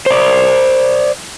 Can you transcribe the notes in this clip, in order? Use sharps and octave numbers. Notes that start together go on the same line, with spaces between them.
C5 D5